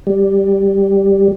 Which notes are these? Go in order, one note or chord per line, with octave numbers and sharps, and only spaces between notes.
G3